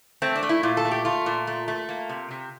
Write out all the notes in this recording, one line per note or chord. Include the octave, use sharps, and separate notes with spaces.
A3 C4
D4
A3
E4
A#2 F4
A4
A3
G4
A3 F4
A#2
A3
A3
A#3
C3
C3